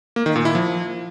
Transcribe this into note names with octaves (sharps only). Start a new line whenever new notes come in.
A#3
D#3
A#2
E4
F3